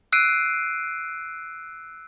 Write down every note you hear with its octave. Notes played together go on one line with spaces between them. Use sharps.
E6 F#6 C7 D7 D#7